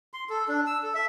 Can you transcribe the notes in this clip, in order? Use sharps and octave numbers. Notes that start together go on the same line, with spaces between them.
C6
A4
D4
E6
A4
E5